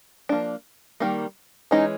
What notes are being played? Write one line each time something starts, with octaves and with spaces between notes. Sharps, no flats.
F3 A#3 D4
D#3 G3 A#3
E3 G#3 C#4 D#4